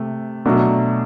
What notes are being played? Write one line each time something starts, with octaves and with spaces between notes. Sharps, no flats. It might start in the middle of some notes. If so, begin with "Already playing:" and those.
Already playing: C3 A3
B2 F#3 A3 D4